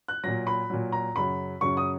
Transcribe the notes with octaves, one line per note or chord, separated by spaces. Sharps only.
F#6
A#2 F#3 A#6
B5
A#2 F#3
A#5
F#2 C#3 F#3 B5
F#2 C#3 F#3 C#6
D#6